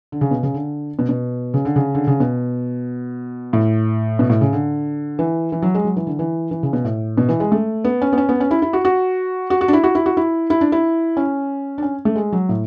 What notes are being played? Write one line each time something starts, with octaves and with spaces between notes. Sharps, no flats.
D3
C#3
B2
C#3
D3
B2
B2
C#3
D3
C#3
D3
C#3
B2
A2
B2
A2
C#3
D3
E3
E3
F#3
G#3
F#3
E3
D3
E3
E3
C#3
B2
A2
B2
E3
G#3
A3
B3
C#4
B3
C#4
B3
C#4
E4
E4
F#4
F#4
F#4
F#4
D4
E4
F#4
E4
F#4
E4
E4
D4
E4
C#4
D4
C#4
A3
G#3
F#3
A2